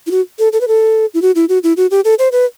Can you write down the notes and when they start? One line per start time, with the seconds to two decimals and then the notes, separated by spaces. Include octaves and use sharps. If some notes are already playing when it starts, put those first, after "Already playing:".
0.07 E4
0.11 F#4
0.39 A4
0.53 A4
0.61 B4
0.68 A4
1.14 E4
1.22 F#4
1.35 E4
1.49 F#4
1.63 E4
1.77 F#4
1.91 G4
2.05 A4
2.19 C5
2.32 B4